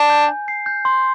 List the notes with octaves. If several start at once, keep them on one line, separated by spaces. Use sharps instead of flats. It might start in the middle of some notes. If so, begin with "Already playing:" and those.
Already playing: D4
G6
G#5
C7
G6
C6